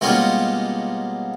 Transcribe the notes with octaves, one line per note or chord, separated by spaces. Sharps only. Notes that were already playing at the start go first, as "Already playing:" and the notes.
B2 G3 G#3 A#3 C#4 F4